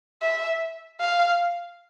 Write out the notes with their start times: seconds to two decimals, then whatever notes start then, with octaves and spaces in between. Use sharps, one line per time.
0.22 E5
1.01 F5